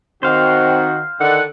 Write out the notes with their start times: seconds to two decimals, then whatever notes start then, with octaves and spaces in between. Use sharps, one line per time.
0.23 D#3 C4 F#4 C5 F5
1.20 D3 D#3 F#5